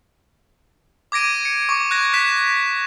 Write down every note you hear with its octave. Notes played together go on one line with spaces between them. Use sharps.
D6 G#6 A#6 D7 D#7
C#7
C#6 D6
F#6 G#6 A#6
F#6 B6 E7